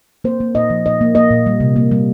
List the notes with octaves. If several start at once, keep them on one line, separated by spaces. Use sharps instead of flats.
A#3 C5
A#3
A#2 D#5
F3
A#2 D#5
A#3
A#3 D#5
A#2
G3
C3
A#3
G3